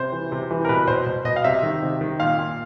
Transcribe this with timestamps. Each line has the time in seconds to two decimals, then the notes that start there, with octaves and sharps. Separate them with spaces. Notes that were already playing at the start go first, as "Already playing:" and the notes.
Already playing: C3 C5
0.12 E3
0.32 C3
0.51 E3
0.65 A#4
0.69 B2 B4
0.88 B2 C5
1.06 B2
1.25 B2 D#5
1.36 F5
1.44 C3 E5
1.63 D#3
1.82 C3
2.01 D#3
2.20 A#2 F5
2.39 A#2